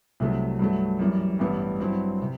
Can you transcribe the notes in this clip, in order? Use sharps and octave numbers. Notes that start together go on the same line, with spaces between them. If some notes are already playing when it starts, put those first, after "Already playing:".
C2 C3 F#3 A3
G2 F#3 A3
F#2 E3 G3
A1 G2 E3 G3 B3
G2 F#3 C4 E4
C3